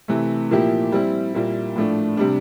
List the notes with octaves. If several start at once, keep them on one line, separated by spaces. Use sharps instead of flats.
C3 E3 A3
A#2 F3 A#3 E4 G4
G3 C4 E4
A#2 G3 A#3 E4
A2 F3 A3 D4
C3 G3 D4